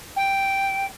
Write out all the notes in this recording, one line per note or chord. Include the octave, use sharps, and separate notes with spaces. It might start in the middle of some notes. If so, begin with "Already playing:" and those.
G5